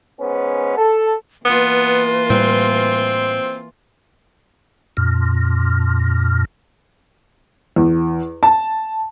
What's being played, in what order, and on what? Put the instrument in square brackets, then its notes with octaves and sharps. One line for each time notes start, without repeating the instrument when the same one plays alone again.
[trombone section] G#2 B3 C#4
A4
[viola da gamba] E3 A#3 F4 [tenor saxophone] B3 [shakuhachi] B4
[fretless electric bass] A2 G3 [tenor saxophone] C4
[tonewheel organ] F2 A#2
[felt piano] E2
A5